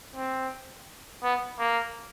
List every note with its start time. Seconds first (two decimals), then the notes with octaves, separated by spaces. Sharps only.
0.16 C4
1.23 B3
1.58 A#3